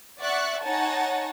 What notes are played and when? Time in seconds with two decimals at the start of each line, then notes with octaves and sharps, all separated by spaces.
0.20 D5 E5 F#5 C#6 F#6
0.62 D#4 C#5 F#5 G#5 A5